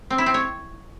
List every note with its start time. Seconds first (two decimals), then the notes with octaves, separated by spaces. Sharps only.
0.10 C4
0.18 E4
0.26 C4
0.34 C#5